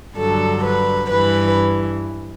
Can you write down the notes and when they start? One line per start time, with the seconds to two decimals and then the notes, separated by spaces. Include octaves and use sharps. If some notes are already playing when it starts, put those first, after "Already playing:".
0.17 G2 D3 F#3 A4
0.63 B4
1.10 G2 E3 B4